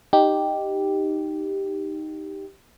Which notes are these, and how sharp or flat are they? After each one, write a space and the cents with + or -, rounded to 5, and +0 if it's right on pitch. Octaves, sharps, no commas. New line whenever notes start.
D#4 +0 G4 +0